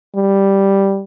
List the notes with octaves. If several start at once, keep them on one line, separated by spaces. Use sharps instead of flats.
G3